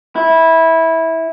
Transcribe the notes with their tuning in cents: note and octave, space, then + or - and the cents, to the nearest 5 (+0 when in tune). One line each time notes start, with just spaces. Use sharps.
E4 -15